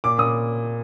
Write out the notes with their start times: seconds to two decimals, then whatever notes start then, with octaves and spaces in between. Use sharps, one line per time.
0.04 A#2 D6
0.18 A#2 D#6